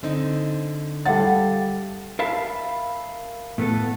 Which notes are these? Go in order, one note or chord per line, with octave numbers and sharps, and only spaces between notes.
D3 C4 D#4
G3 A4 F5 F#5 A6
A#4 E5 F5 A5 B5
A2 A3 B3 A4